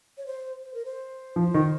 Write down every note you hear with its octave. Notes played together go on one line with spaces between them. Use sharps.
C#5
C5
C5
A#4
C5
F3
D#3